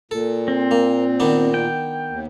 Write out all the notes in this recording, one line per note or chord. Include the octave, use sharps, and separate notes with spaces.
A#2 A4
C4
A#3
D#3 B3 D4
G5
D#2